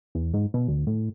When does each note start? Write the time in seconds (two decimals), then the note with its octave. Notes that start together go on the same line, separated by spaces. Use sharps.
0.15 E2
0.34 G#2
0.54 B2
0.68 D2
0.87 A2